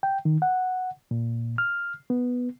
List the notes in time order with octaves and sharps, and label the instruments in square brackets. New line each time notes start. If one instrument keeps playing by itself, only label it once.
[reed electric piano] G5
D#3
F#5
A#2
F6
B3